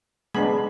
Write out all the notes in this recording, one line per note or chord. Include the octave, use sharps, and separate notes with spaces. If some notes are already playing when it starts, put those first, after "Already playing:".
G#3 B3 D4 B5